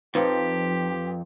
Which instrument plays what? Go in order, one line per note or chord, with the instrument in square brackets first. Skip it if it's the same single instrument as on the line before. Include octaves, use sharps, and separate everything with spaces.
[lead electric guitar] F2 [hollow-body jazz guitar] F3 D#4 F4 [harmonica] G4 [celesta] B4 C6